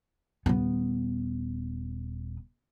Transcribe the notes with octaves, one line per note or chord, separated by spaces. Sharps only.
D#1 B3